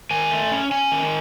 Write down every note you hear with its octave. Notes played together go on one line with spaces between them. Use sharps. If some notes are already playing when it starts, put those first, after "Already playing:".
D#3 G#5
A3
C#4
C#4 G#5
D#3